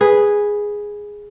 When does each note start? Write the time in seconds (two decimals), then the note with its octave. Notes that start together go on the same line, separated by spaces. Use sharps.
0.01 G#4 B4